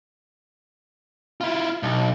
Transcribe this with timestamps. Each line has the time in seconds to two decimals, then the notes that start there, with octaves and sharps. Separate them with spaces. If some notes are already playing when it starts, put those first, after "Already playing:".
1.41 E4 F4
1.83 B1